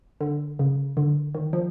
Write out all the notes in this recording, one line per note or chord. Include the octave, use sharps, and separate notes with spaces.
D3
C#3
D3
D#3
F3